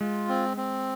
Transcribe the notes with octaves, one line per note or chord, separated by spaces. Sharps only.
G#3 F4
C4
C4